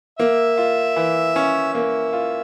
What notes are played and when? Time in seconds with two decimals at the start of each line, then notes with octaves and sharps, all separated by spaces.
0.19 A#3 E5
0.58 F4
0.96 E3
1.36 C#4
1.74 A#3 E5
2.13 F4